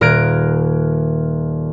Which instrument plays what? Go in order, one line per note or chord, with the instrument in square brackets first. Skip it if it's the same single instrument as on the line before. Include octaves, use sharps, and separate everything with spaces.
[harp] D#1 A#4 F6 F#6 G#6 D7